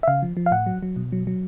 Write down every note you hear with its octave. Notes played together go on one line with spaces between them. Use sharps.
E5
C#3 F5
F3
F3
F5
A2 F#5
F#3
F#3
B2
F#3
F#3